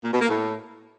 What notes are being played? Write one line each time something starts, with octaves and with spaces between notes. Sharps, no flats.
A#2
B2
A#3
A2